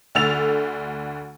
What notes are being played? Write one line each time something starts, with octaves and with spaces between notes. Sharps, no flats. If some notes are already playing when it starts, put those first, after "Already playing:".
D2 D3 A3 E6 A6 F7